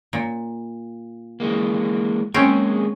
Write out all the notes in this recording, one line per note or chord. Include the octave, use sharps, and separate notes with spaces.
A#2
E3 G#3 A#3
G#3 A#3 C4 C#4 G#4